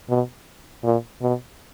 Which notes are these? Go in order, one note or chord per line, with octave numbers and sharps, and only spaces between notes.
B2
A#2
B2